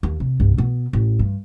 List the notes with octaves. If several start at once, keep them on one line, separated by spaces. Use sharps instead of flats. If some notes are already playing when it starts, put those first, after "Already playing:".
D#2
C3
C2 G2
B2 B3
A1
G2